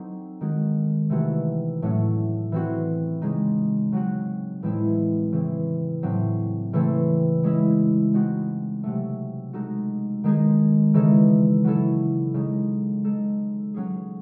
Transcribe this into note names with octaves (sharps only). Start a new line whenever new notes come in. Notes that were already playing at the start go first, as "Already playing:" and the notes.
Already playing: F#3 C4 D#4 A4
D#3 G#3 C#4 F#4
C3 E3 A3 D#4 F#4
A2 F#3 A3 C#4
E3 C4 F#4
C#3 G#3 D#4
C#3 F#3 C4 F#4
A2 E3 G#3 C4 E4
C#3 E3 C4
A2 F#3 C4
C#3 E3 A3 C4
G#3 C#4 E4
G#3 C4 D#4 F#4
C3 F#3 A3
G#3 D#4 F#4 A4
D#3 G#3 D#4 G#4
C#3 E3 G#3 D#4 A4
F#3 C#4 E4 A4
C#3 G#3 D#4
G#3 D#4 A4
F#3 C#4 G#4